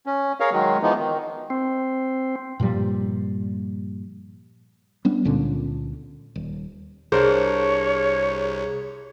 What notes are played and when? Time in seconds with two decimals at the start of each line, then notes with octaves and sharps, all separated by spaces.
0.06 C#4
0.40 G#4 A#4 C#5 F5
0.52 D#3 F#3 G#3
0.82 E3 F3 G#3 B3 D#4
0.98 D#3
1.50 C4
2.60 G2 A#2 F3 G3
5.05 G3 B3 C#4 D4
5.25 C#2 A#2 D3 C#4
6.36 D#1
7.12 C2 D4 G#4 A#4 C5 C#5